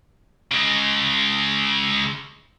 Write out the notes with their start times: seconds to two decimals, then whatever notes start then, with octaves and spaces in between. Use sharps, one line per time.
0.52 C#3 G#3